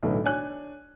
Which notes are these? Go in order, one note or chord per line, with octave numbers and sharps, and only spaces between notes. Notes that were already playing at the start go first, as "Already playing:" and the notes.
B1 A2 D3 E3 F#3
D4 C#5 G#5 F#6